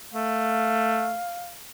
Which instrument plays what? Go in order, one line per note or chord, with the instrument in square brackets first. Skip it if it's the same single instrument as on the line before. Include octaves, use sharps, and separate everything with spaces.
[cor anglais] A3 [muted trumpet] F5